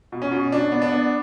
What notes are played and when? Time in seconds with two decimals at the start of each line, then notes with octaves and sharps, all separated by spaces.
0.12 B2
0.22 C#4
0.32 B2
0.52 B2 D4
0.72 B3
0.82 D4
0.92 B3